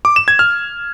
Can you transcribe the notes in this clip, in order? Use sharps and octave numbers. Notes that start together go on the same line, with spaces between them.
D6
E7
G#6
F6